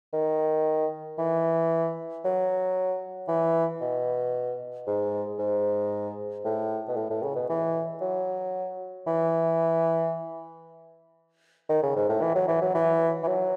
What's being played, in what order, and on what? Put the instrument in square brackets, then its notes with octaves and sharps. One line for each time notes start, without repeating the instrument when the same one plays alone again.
[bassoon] D#3
E3
F#3
E3
B2
G#2
G#2
A2
B2
A2
A2
C#3
B2
E3
F#3
E3
D#3
C#3
G#2
A2
E3
F#3
E3
F#3
E3
E3
F#3